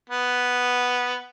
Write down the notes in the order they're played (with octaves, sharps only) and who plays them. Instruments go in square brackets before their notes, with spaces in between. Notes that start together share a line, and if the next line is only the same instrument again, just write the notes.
[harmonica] B3